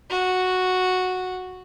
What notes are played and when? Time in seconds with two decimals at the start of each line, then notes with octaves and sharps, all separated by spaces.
0.11 F#4